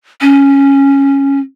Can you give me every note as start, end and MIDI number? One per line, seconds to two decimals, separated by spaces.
0.21 1.40 61